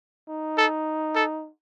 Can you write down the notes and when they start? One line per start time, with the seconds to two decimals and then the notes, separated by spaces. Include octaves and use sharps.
0.29 D#4
0.58 A4
1.15 A4